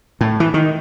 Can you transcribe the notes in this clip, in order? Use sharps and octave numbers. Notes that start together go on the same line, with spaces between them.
A2
E3
D#3